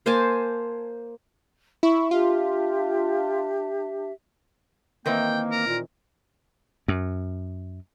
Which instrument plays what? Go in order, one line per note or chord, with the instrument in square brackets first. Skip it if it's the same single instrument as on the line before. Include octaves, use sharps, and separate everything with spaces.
[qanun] A#3 C5 G#5 A5
[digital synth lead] E4 [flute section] C#6
[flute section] D4 G4 E5 [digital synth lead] F4
[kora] D#3 E3 C4 [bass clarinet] A#3 [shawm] G5
[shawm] A#4
[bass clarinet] A#2
[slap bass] F#2